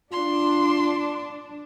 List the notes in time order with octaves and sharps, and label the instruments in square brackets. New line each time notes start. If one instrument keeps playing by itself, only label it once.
[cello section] D4 [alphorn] F4 [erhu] C6